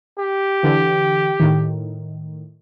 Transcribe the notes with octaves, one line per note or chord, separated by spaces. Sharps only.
G4
D3 E3
A2 D#3